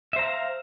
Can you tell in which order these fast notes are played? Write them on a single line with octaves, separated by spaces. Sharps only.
E5 C5 A#5 F5